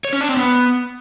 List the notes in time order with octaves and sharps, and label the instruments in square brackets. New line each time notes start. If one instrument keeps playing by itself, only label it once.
[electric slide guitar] C#5
C#4
D4
C4
B3